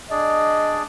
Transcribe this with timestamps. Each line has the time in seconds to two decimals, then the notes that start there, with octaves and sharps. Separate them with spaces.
0.11 D4 G#4 D5 D#5